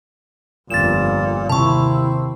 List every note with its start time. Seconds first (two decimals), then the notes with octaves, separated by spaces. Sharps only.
0.70 G1 F2 A#2 A6 E7
1.49 D#2 C3 C4 E4 A5 C#6